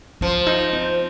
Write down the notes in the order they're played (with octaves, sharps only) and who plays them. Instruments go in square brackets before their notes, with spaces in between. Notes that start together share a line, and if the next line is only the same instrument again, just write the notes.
[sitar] F3 [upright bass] C4
[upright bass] D#4
C4